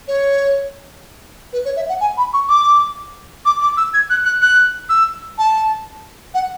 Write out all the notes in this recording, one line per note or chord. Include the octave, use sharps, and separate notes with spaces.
C#5
B4
C#5
E5
F#5
G#5
B5
C#6
D6
D6
D6
E6
G#6
F#6
F#6
F#6
E6
A5
F#5